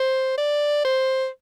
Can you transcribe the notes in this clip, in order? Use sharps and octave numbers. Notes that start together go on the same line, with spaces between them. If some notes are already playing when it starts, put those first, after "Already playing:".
Already playing: C5
D5
C5